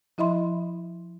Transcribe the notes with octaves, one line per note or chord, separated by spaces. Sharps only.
F3 E4 D#5 E5 B5 C6